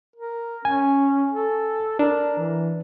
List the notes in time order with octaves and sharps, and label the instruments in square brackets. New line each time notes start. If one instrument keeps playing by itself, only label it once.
[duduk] A#4
[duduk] C#4 [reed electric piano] G#5
[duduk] A4
[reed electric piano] D4 [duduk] A#4
[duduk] E3